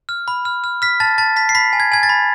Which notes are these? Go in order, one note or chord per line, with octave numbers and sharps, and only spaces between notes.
F6
B5
F6
F6
F6 B6
A5 A6
A5 A6
A5 B6
C7
B5 B6
G#5
G#6
G#5 G#6
A6
B5